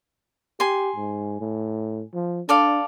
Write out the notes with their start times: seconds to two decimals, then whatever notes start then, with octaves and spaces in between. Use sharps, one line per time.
0.60 G4 G#5 C6
0.96 G#2
1.40 A2
2.14 F3
2.49 D4 A4 D5 F5